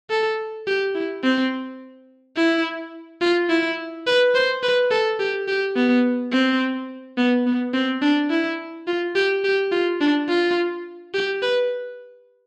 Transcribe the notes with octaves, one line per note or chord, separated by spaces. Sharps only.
A4
G4
E4
C4
E4
F4
E4
B4
C5
B4
A4
G4
G4
B3
C4
B3
B3
C4
D4
E4
F4
G4
G4
F4
D4
F4
G4
B4